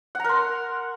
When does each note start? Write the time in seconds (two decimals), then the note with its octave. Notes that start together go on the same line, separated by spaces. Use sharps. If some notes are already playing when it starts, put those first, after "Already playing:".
0.15 F#5
0.20 A#5
0.24 A#4
0.29 C6